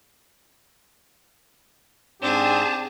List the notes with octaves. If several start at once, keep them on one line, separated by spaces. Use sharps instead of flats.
G#2 C4 D4 G4 G#4 A5